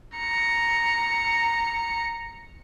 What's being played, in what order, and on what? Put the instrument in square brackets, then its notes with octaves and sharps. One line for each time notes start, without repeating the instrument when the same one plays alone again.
[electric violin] A#5 C#7